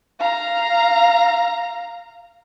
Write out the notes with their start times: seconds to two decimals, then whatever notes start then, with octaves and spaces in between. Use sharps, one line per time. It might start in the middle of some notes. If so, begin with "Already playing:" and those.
0.20 F5 A#5